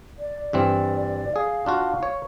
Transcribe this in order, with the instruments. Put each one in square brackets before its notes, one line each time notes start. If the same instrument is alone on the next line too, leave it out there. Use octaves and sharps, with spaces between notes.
[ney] D5
[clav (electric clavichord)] G2 E3 C4
[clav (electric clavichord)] G#4 [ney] F5
[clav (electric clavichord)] D4 F4 F#4
C#5